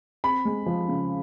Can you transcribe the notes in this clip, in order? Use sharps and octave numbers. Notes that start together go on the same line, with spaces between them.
C4 B5
G#3
F3
C#3